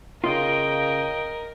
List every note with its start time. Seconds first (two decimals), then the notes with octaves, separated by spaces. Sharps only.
0.24 C#3 F4 A#4 D#5 G5